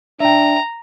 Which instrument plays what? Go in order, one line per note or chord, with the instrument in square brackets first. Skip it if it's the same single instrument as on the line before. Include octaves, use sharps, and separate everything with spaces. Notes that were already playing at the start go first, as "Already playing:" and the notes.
[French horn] D4 [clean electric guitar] E5 G5 [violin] A#5